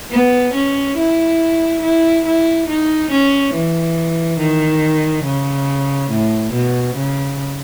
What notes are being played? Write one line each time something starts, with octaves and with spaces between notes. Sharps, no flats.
B3
C#4
E4
E4
E4
D#4
C#4
E3
D#3
C#3
A2
B2
C#3